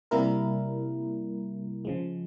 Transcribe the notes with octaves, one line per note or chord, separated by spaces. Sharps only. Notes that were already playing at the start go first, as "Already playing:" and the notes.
C3 G3 A#3 E4 A#4
C#3 F3 G#3